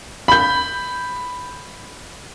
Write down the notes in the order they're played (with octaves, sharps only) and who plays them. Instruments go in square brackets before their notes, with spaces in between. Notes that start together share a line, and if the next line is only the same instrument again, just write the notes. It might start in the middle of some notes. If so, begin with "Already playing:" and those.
[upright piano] B5 G6